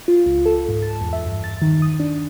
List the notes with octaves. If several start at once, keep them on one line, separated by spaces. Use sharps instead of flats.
F4
C#2
A4
G#2
A5
E2
E5
G2
A6
D#3
D#6
D4